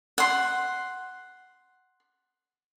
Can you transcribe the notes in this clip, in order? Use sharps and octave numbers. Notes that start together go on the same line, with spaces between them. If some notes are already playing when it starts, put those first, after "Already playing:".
F#5 C6